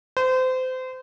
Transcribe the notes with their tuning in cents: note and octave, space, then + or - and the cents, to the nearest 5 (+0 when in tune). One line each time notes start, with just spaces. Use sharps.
C5 -30